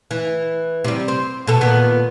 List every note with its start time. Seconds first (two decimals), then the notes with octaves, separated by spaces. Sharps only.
0.11 E3
0.84 C3 G3
1.08 C4
1.47 B2 A4
1.61 A#2 D#3 B3